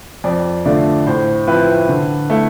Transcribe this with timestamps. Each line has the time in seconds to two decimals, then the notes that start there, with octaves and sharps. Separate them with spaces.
0.24 F2 D5
0.65 D3 A3 D4 F4 D5
1.06 A2 C5
1.47 F3 C4 E4 B4
1.89 D3
2.30 A3 E4